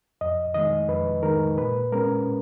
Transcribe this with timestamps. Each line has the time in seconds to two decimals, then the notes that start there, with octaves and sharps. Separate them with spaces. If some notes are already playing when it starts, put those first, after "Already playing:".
0.21 F2 D#5
0.54 D#3 G#3 D#5
0.89 F2 B4
1.23 D#3 G#3 A#4
1.57 A#2 B4
1.92 G#3 C#4 A#4